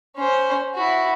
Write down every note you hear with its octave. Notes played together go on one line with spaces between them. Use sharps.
C#4 C5
E4 F#4